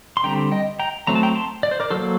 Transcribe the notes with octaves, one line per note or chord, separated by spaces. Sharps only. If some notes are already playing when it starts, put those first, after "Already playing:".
C6
D3 G3 C4 G5 A#5
D#5 G5
G5 A#5
F#3 A3 C4 A#5
A5
G5 A#5
A5 C6
D5
C5
A#4 D5
F#3 A#3 A4 C5